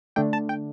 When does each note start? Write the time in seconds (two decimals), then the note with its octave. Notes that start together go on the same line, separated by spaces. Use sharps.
0.16 D3 A3 D4 G5
0.33 A5
0.49 G5